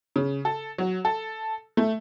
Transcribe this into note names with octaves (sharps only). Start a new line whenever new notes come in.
C#3
A4
F#3
A4
A3